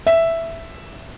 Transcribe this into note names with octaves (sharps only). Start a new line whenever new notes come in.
E5